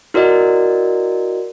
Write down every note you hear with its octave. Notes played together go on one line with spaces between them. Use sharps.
E4 F#4 A#4 D5 D#5